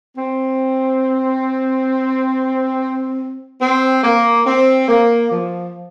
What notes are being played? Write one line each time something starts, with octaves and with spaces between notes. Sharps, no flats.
C4
C4
A#3
C4
A#3
F3